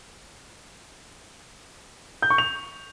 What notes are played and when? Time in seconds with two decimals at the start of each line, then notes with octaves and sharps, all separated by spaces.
2.22 G6
2.30 C#6
2.38 F7